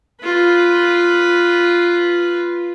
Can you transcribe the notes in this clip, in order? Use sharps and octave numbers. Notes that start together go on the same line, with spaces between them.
F4 B4